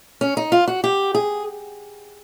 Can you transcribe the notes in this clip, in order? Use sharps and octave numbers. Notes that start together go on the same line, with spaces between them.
C#4
D#4
F4
F#4
G4
G#4